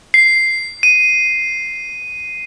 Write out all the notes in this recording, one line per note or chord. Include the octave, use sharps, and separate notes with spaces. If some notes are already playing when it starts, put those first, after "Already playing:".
C7
D#7